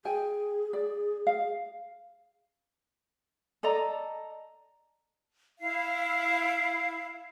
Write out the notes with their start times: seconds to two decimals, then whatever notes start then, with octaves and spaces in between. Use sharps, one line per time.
0.05 G#4 G5 G#5
0.73 D5
1.27 F5
3.63 A4 D5 D#5 A#5
5.59 E4 F5